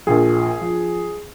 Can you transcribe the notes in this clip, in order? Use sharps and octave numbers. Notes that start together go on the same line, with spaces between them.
A#1 A#2 F3 G#4
F3